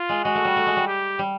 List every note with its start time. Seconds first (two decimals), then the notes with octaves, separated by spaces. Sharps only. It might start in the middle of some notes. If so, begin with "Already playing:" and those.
Already playing: F4
0.09 G#3
0.24 G#3 F#4
0.35 A3
0.45 G3
0.56 A3
0.66 G#3
0.76 G3
0.87 G4
1.19 G3